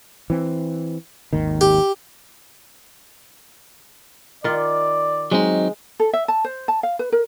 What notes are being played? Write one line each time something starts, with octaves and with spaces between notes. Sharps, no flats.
E3 C4
G#1 D#2 D#3
G4
D#3 F4 D5
F#3 G#3 C4 D#4
A4
E5
A5
C5
A5
F5
B4
A#4